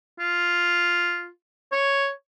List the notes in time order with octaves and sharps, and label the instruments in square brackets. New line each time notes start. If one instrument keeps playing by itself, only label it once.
[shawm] F4
C#5